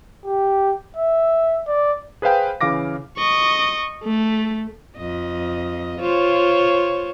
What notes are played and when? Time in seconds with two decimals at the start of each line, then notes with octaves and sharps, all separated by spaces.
0.25 G4
0.97 E5
1.68 D5
2.22 G#4 B4 C5 F5 G5
2.61 C#3 E3 F5 D6 A#6
3.18 D#5 C#6
4.04 A3
4.97 F2 D#5
5.99 F4 C5 C#5